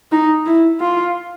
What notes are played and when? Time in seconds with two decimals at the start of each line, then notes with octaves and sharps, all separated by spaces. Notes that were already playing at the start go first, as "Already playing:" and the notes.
0.12 D#4
0.46 E4
0.80 F4